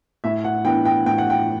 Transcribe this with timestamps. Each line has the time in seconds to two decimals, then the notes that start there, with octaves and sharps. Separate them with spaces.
0.24 A2 E5
0.44 F#5
0.65 E3 B3 D4 G5
0.85 G5
1.06 A2 G5
1.18 F#5
1.30 G5